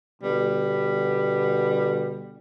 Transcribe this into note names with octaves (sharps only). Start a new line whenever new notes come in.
B2 D3 G3